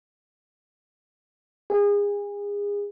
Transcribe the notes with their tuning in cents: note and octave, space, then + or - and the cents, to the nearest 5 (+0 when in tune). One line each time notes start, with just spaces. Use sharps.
G#4 -30